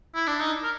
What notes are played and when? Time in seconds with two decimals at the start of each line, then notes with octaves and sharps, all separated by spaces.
0.15 E4
0.27 D4
0.40 D#4
0.64 A#4